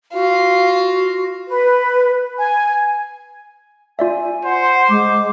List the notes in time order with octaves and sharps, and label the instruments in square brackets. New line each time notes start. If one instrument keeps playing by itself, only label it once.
[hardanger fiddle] F4 [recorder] F#4
[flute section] B4
G#5
[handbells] F4 D5 E5 [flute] G#5
[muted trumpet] C5 [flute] F#5
[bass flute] G#3 [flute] D6